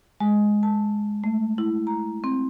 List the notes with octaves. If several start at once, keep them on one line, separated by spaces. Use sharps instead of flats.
G#3
A5
A3
E4
A#5
C4